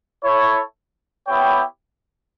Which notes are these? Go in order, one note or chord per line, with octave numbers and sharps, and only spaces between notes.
E4 A4 C#5
B3 E4 G4 C#5 G5